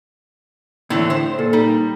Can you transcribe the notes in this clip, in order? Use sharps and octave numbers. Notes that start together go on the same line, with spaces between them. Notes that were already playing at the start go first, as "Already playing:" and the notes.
A2 D3 E3 C4
C5
A#2 A4
G3 D#4